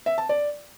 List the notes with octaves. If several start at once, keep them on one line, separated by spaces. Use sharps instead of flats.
E5
A5
D5